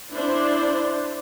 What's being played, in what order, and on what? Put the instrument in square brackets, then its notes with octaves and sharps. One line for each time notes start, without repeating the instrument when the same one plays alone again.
[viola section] D4 E4 C5